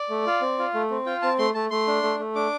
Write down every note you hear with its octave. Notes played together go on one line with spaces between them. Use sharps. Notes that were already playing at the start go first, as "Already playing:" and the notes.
Already playing: D5
A3
F4
C4
F4
A3
C4
F4 G5
C4 A5
A3 C6
A3 A5
A3 C6
D4
A3
A3
D4 D6